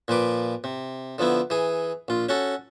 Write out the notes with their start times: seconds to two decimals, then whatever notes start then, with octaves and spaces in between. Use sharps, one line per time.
0.08 A#2 F3 B4 D6
0.64 C3
1.18 D3 F3 B3 E4
1.50 E3 G#4
2.08 A#1 F4
2.29 C#4 F#4 A4